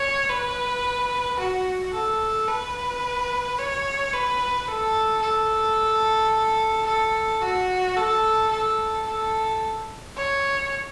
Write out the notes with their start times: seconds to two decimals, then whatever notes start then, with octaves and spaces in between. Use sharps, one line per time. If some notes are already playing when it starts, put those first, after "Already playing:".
Already playing: C#5
0.29 B4
1.39 F#4
1.93 A4
2.48 B4
3.58 C#5
4.13 B4
4.68 A4
5.22 A4
6.87 A4
7.42 F#4
7.96 A4
8.51 A4
9.06 A4
10.16 C#5